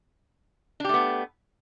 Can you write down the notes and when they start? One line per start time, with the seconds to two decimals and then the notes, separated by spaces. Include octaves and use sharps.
0.80 D4
0.85 G4
0.89 A3
0.94 B3